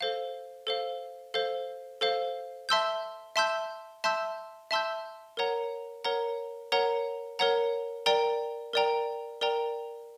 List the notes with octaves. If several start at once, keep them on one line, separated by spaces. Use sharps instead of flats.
A4 C5 F5
A4 C5 F5
A4 C5 F5
A4 C5 F5
E5 A5 C6 E6 G6
E5 A5 C6 E6 G6
E5 A5 C6 E6 G6
E5 A5 C6 E6 G6
A#4 C#5 F#5 A#5
A#4 C#5 F#5 A#5
A#4 C#5 F#5 A#5
A#4 C#5 F#5 A#5
A#4 D5 G5 A#5
A#4 D5 G5 A#5
A#4 D5 G5 A#5